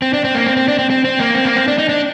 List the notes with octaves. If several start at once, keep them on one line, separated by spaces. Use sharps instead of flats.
C4
D4
C4
A#3
C4
C4
D4
C4
C4
C4
A#3
C4
A#3
C4
D4
D#4
D4